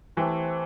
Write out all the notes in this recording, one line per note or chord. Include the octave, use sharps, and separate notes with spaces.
E3 A3 C4 G4 B4